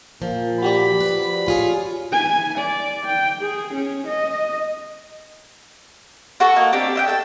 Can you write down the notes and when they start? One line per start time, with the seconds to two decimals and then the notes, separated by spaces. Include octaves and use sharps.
0.22 A#2 F3
0.62 F#4 G4 D5 B5
1.00 F3 B4
1.46 C#4 F4 G#4
2.12 G#5
2.58 D5
3.05 G5
3.41 G#4
3.74 C#4
4.07 D#5
6.40 F#4 A4 C#6
6.56 A#3 D#5
6.73 C4 D4 G4
6.95 D#5 E5 G5
7.08 A4 G5